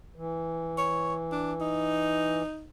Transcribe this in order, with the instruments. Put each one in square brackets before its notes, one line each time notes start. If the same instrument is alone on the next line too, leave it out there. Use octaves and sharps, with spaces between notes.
[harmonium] E3
[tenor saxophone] C#5
D4
D#4